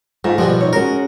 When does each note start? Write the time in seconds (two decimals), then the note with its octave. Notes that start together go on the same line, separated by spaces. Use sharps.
0.24 G#2 A3 F4
0.38 B2 D3 F3 G3
0.61 D#4 C#5
0.73 G#3 C#4 F#4 A#4